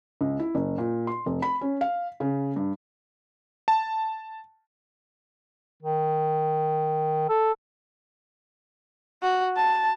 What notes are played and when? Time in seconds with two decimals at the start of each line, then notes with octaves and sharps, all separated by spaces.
0.21 C#2
0.40 E4
0.55 F#1
0.78 A#2
1.07 C6
1.26 F1
1.42 B5
1.61 C#4
1.81 F5
2.20 C#3
2.56 G2
3.68 A5
5.83 D#3
7.29 A4
9.22 F#4
9.56 A5